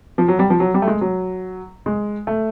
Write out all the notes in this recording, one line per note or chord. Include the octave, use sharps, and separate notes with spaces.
F3
F#3
G3
F3
F#3
G3
A3
G#3
F#3
G#3
A3